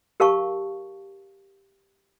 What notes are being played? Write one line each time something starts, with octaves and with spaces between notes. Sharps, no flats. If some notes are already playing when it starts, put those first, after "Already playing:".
G4 A#4 F5 A5 C#6